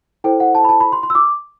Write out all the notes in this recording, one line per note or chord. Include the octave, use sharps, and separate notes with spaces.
E4 A4 C5 G5
F#5
A5
B5
A5
B5
C6
C6
E6
D6